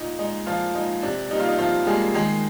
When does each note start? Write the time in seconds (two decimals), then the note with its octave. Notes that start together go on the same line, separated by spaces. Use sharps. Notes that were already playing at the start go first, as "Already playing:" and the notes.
Already playing: A#2 D#4
0.19 G#3 D#4
0.47 A#2 F3 F4
0.74 G#3 D#4
1.02 C3 D4
1.30 G3 A#3 D#4
1.40 F4
1.49 D#4
1.59 C3 F3 F4
1.87 G3 G#3 A#3 G#4
2.14 D#3 G#3 G#4